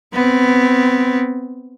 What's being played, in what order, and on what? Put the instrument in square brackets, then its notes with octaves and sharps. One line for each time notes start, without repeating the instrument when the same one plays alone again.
[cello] B3 C4